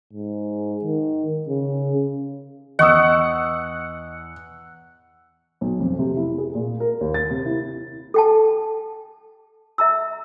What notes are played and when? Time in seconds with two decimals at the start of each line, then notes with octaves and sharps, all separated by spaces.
0.13 G#2
0.84 D#3
1.48 C#3
2.79 E2 D#5 F#5 C#6 D#6 E6
5.61 B1
5.80 F2
5.99 C3
6.17 E4
6.38 G#4
6.55 A#2
6.80 A#4
7.01 D#2
7.14 A6
7.31 C3
7.46 E4
8.14 A4 G5 A5
9.78 E5 A#5 E6